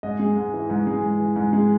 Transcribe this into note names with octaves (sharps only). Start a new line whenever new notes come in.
G#2 D#5
G#3
G#2
E3
G#2
G#3
G#2
E3
G#2
G#3